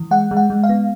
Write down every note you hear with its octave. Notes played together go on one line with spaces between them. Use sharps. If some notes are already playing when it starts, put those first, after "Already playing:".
Already playing: E3
G#3 F#5
G#3
F#5
G#3
F5
B3